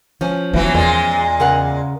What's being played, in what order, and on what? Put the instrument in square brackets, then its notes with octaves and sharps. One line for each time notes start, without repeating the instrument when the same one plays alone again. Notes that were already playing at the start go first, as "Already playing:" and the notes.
[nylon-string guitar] F3 C#4
[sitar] E3 F#3 [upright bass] B3
[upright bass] E2 [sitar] A#2 G#3
[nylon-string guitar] C#3 A#4 F#5